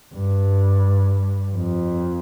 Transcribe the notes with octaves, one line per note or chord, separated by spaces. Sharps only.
G2
F2